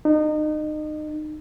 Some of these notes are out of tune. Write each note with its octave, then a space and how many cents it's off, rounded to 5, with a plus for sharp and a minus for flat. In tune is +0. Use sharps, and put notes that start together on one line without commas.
D#4 -30